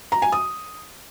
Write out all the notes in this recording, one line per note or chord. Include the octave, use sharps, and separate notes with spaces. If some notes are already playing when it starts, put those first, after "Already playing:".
A#5
G#5
D#6